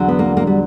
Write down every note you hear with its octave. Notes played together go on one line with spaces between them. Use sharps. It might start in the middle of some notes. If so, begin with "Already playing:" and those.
Already playing: E2 D3 F#3
B3
A#3
A#3
G3